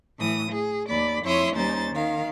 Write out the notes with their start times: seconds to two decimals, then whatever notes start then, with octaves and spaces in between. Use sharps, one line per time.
0.18 A2 E3 D#6
0.51 G#4
0.88 D#2 D5 B5
1.24 F2 E4 C#5 E5 C6 D#6
1.53 D#2 G3 C#4 D#4 C5 A6
1.91 D#3 F5